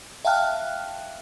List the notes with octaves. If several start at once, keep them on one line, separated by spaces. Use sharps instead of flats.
E5 F5 G5 A5 F6 F#6